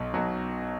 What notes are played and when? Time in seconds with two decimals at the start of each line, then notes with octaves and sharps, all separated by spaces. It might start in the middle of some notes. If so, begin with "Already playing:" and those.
Already playing: B1 B2 F#3
0.13 B1 B2 F#3